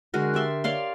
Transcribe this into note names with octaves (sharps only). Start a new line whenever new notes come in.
D3 G#3 F#4 A#4
G4 D5 E5 C6
C#5 D5 F5 C6